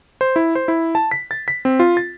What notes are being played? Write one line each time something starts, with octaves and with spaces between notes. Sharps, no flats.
C5
E4
C5
E4
A5
B6
A6
B6
C4
F4
A6